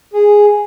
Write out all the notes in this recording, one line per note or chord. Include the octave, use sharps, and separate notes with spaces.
G#4